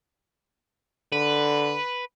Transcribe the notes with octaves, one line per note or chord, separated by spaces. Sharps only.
D3 B4